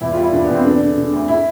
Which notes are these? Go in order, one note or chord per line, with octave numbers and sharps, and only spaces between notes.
E2 E4
G3 F4
E4
E2 D4
B3
E2 C4
D3 D4
D3
D3
D2
E4